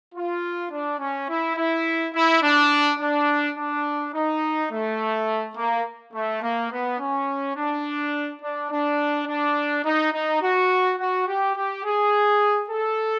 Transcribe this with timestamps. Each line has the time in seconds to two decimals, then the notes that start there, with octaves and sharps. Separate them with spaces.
0.14 F4
0.70 D4
0.99 C#4
1.28 E4
1.56 E4
2.14 E4
2.42 D4
2.99 D4
3.57 D4
4.14 D#4
4.71 A3
5.56 A#3
6.13 A3
6.42 A#3
6.71 B3
6.99 C#4
7.55 D4
8.41 D4
8.70 D4
9.27 D4
9.84 D#4
10.12 D#4
10.41 F#4
10.99 F#4
11.27 G4
11.56 G4
11.84 G#4
12.69 A4